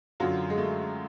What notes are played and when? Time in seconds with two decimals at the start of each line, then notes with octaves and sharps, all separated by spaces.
0.20 F#2 D3 F#3 F4
0.50 G#3
0.57 A3